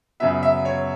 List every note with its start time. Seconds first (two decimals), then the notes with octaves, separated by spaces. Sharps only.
0.20 F#2 C#3 F#3 B3 E5
0.43 E5
0.65 C#5